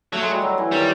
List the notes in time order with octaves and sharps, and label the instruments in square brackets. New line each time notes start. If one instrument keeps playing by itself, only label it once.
[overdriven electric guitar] F#3 [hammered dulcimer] A3
[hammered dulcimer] G#3
G3
F#3
E3
[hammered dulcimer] D#3 [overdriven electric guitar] G3